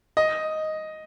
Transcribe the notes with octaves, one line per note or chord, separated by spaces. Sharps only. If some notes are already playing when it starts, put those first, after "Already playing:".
D#5